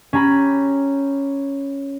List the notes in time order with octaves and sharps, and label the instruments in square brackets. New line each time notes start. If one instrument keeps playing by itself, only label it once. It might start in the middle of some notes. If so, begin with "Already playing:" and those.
[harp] C#4 G4 A#5 B5